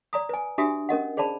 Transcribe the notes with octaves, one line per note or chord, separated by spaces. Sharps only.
D5 A#5 D#6
B4 G#5
D4 F#4 G4 E5 G#5 D#6
C#4 A#4 D#5 F#5
G#4 C5 D5 A5 B5